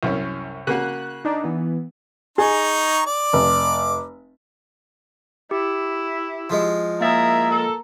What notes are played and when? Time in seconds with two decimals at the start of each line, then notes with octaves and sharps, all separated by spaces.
0.03 C2 F#2 C#4
0.67 C#3 A#3 F#4 F#6
1.25 D4 D#4
1.44 E3 B3
2.38 D#4 G#4 A#5 C#6
3.06 D5 D6
3.33 F1
5.51 E4 G4
6.50 F3 G#3
7.01 A#3 E4 G#4 A#4 E5 A6
7.50 A4